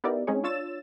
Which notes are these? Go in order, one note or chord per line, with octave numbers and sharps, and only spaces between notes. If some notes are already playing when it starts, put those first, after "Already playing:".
B3 D#4 E4 G4 A#4 D5
G#3 C4 C#4 D#4 G#4 C#5
D4 F4 C#5 E6 A6 E7